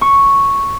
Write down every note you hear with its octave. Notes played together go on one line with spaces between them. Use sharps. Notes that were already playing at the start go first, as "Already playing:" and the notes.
C#6